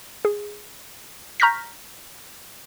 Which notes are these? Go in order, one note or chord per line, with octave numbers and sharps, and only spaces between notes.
G#4
A#5 C#6 F6 G6 A#6 B6